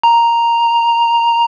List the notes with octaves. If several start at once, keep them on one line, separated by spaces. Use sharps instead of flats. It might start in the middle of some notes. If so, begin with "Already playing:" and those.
A#5